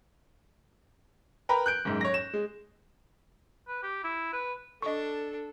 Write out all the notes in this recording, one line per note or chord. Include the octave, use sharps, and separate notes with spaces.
A#4 B4 G5 A#5 B5
F#6 G6 D7
F#1 G#2
C#5 A#6
E7
G#3
B4
G4
E4
B4
D4 A4 D#5 C#6